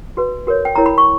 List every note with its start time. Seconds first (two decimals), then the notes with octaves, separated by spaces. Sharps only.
0.17 F#4 B4
0.47 F#4 A#4 C#5
0.65 G5
0.75 E4 A#4 C#5 A#5
0.86 B5
0.98 C#6